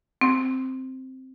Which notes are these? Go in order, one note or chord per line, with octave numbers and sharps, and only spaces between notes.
C4